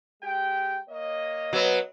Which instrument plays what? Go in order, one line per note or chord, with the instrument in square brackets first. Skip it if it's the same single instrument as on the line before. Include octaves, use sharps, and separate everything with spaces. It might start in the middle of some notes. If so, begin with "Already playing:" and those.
[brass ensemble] G#3 G4 G5
A#3 C#5 D#5
[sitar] F#3 B3